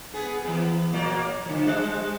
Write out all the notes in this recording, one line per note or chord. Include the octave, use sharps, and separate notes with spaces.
B3 G#4
E3 B3
A#2 F#3 A#3
D3 F3
G3 C5